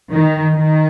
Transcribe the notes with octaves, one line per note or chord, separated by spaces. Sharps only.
D#3
D#3